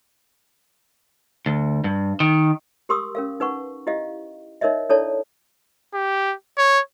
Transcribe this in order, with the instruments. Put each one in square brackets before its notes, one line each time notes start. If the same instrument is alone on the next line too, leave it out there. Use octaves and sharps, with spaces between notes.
[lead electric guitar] D2
G2
D#3
[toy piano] G4 A#4 C6 C#6 D#6 E6
C#4 A#4 F5
D#4 B4 F#5 C#6
E4 G4 D#5 F5
D#4 A#4 C#5 D#5 E5
D4 E4 A4 C#5 D5 A5
[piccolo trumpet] G4
C#5